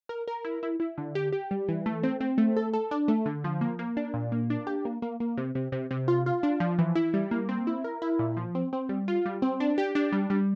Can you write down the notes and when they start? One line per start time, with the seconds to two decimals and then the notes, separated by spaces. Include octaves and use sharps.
0.09 A#4
0.28 A#4
0.45 E4
0.63 E4
0.80 E4
0.98 D3
1.15 G4
1.32 G4
1.51 G3
1.68 E3
1.86 A3
2.03 C4
2.20 C4
2.38 A3
2.57 A4
2.73 A4
2.91 D4
3.08 A3
3.26 D3
3.44 F3
3.61 A#3
3.79 A#3
3.97 D4
4.14 A#2
4.32 A#3
4.50 D4
4.67 G4
4.85 A#3
5.02 A#3
5.20 A#3
5.37 C3
5.55 C3
5.72 C3
5.91 C3
6.08 F4
6.26 F4
6.43 D4
6.60 F3
6.79 E3
6.95 E4
7.14 G3
7.31 A#3
7.49 C4
7.67 E4
7.84 A#4
8.02 E4
8.19 A#2
8.37 F3
8.55 C4
8.73 C4
8.89 G3
9.08 F4
9.26 G3
9.42 C4
9.60 D4
9.78 G4
9.95 D4
10.12 G3
10.30 G3